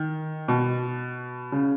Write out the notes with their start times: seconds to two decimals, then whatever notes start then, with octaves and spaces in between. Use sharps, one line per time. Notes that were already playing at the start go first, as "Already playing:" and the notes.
Already playing: D#3
0.48 B2
1.52 C#3